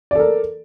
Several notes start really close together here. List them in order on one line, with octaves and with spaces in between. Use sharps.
D5 A4 A#4